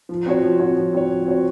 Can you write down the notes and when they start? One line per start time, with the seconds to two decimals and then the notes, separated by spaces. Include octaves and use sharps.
0.09 F3
0.26 C4 F#4 C#5
0.43 F3
0.59 C4 F#4 C#5
0.76 F3
0.93 C4 F#4 C#5
1.10 F3
1.27 C4 F#4 C#5